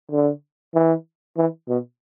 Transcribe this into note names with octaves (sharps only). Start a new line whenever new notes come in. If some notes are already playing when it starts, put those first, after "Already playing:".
D3
E3
E3
B2